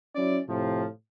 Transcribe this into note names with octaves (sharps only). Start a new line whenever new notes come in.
F#3 C#4 E4 D5
A2 C3 F3